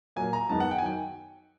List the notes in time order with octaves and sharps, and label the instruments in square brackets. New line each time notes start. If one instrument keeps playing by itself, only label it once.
[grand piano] A#2 F#3 A#3 G#5
A#5
F#2 D#3 G#3 B3 A5
F#5
G5
G#5
D#3 F#3 G5